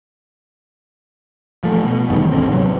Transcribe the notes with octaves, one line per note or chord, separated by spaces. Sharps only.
F3 A3
B2
F1 E2 D#3 G3
D#1 G#1 D3 C4
C3 F#3